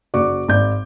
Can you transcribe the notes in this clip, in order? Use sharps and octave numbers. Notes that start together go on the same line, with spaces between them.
F#1 F#4 D5 C#6 D6
G#1 D5 G6